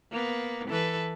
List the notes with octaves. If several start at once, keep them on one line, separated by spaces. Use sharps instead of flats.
A#3 B3
E3 A4 B4